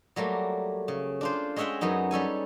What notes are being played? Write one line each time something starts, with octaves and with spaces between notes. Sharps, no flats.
F#3 G3 A3 A#3
C#3
D4 F4 C5
G#3 C#4 G#4 E5 F#5 G5
F#2 F#3 B3 D#4
G3 C#4 A4 G#5